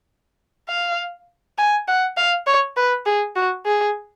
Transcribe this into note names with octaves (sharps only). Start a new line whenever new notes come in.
F5
G#5
F#5
F5
C#5
B4
G#4
F#4
G#4